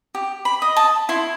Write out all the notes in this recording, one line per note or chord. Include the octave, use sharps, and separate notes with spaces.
G4
B5
D#5
A5
E4 C6